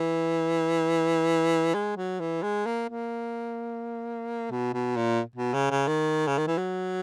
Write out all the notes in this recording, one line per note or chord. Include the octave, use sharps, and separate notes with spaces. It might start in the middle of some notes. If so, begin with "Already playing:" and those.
Already playing: E3
G#3
F#3
E3
G#3
A#3
A#3
B2
B2
A#2
B2
C#3
C#3
D#3
C#3
D#3
E3
F#3